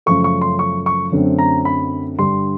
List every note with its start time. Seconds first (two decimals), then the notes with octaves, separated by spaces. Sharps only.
0.06 F#2 C#3 F3 A3 C#6
0.24 C#6
0.41 C6
0.59 C#6
0.86 C#6
1.12 F#2 D3 F#3 A3 C4
1.39 A#5
1.65 B5
2.18 G2 D3 G3 C6